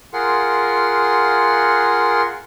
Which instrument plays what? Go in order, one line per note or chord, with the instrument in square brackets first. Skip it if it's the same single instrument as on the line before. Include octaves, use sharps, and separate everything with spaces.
[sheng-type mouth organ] F4 G#4 A#4 F#5 C6